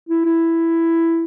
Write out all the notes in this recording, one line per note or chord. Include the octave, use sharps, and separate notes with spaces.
E4
E4